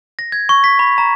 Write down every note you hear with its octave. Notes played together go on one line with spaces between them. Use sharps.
A#6
G#6
C#6
B6
B5
A#5